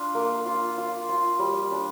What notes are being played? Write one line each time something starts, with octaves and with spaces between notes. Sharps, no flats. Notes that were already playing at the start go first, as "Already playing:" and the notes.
Already playing: D4 F4
A#3
F4
F4
F4
G3
D4